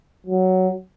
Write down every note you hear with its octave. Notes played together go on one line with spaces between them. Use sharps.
F#3